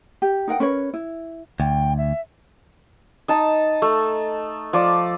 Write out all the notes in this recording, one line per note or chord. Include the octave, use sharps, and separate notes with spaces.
G4
D#4 A#4 F#5 G5
C#4 A#4 B4 C#5
E4
D2 G5
E5
D#4 A5
A3
F3 D5